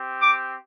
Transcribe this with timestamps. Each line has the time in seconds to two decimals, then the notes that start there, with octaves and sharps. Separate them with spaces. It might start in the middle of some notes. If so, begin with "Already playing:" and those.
Already playing: C4 G4
0.21 D6